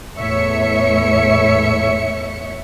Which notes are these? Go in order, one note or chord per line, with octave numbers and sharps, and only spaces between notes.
E2 A2 C#5 E5 C#7